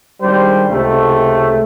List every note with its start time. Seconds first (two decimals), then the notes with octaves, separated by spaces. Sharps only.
0.21 G#1 G3 D4 C5
0.70 C#2 C3 A3